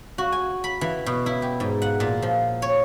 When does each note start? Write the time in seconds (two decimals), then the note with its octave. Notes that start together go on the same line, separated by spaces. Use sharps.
0.18 F#4
0.32 G#5
0.64 B5
0.81 E3
1.06 B2
1.26 E4
1.42 G4
1.60 G#2
1.82 F#5
2.00 A#2
2.22 F3
2.62 C#5